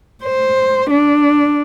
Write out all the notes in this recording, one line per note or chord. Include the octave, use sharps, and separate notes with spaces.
C5
D4